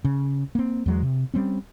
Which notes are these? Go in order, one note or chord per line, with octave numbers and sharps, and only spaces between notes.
C#3
A#3 C4
E2 F#3 G#3
C3
G3 C4 C#4